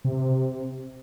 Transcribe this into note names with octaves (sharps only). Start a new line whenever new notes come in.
C3